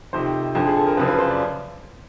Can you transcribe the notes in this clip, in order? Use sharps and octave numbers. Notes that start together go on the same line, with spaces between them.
F2 C3 D#3 C5
F2 D3 F3
G#4
A4
A#4
F#2 C#3 F3 B4
B4
C5
D5